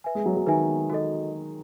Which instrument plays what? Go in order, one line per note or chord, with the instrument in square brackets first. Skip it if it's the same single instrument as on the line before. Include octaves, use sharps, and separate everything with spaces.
[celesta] B4 E5 G#5
[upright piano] G#3
F#3
F#3
[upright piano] D#3 [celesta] B4 E5 G#5
[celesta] F#4 A4 D#5